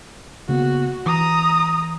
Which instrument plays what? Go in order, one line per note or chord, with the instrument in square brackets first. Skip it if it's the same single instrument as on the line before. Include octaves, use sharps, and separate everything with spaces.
[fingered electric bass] C#3 A#3 B3 [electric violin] F#4
[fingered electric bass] E3 [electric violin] A#5 D#6